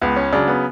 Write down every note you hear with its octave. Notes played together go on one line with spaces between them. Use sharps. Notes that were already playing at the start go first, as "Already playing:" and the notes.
C#2 B3
C#4
C#3 F#3 D4
B3